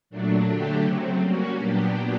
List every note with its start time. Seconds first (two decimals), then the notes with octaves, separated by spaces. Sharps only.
0.10 A#2 F#3 A3 D4
0.46 D3 F#3 A3 D4 G4
0.82 C#3 F#3 A3 C4
1.19 G3 A#3 C#4 F#4
1.56 A#2 F#3 B3 D4 G4